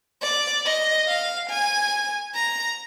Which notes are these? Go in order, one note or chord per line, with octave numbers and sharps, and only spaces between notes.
D5
D#5
F5
G#5
A#5